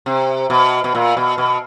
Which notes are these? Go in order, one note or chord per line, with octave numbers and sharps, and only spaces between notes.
C3
B2
B2
A#2
B2
B2